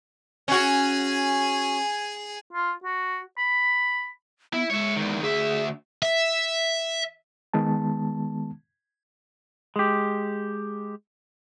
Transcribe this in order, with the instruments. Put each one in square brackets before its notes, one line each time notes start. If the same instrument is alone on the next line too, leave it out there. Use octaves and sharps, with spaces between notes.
[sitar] C#4 F#4 [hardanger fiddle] G#4 G#5
[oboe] F4
F#4
B5
[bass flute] B3 [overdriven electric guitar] E4
[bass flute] G#3 [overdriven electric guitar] C#5 E5
[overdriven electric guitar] E2 D#3
[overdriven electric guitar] D2 E5 [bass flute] G#4
[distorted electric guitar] E5
[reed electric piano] D#3 G#3 B3 A5
[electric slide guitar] G#3 G4